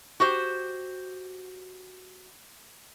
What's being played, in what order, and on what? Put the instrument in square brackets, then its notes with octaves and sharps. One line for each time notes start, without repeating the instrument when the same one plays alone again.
[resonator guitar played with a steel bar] F#4 G4 C5